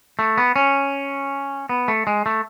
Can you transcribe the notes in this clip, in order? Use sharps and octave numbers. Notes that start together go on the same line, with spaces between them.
A3
B3
C#4
B3
A3
G#3
A3